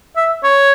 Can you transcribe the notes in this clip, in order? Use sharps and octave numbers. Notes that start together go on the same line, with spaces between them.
E5
C#5